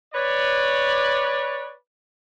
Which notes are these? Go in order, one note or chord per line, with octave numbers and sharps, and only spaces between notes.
B4 C#5 D5